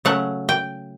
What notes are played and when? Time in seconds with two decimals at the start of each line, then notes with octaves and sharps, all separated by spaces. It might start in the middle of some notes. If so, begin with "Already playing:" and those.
0.05 C#3 F#3 A3 F#5
0.49 G5